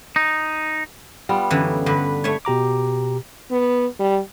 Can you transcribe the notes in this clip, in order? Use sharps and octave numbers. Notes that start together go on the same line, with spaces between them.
D#4
G3 B3 F4
F#2 D3 E3
G2 D3 B4
A3 C#5
B2 G4 A#5 D6
B3
G3